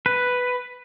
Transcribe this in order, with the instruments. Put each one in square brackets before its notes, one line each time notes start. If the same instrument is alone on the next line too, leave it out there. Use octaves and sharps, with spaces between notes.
[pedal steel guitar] B4